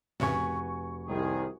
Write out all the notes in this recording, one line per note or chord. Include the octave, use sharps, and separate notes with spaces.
F1 A2 C#3 F#4 B4 G#5 C#6
C2 D#3 G#4